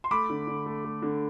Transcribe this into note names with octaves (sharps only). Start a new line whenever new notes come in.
C6
A3 B5 D6
D3
D3
A3
A3
D3